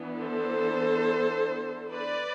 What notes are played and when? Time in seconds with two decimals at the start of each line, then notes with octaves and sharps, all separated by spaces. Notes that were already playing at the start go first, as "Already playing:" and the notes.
Already playing: E3 B3 D4
0.19 A4 C5
1.92 B4 D5